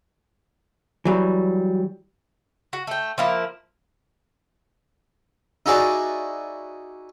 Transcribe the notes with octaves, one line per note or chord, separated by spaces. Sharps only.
E3 F#3 G3
F#4
A3 G5
F3 A#3 E4
D#4 E4 F#4 G#4 D5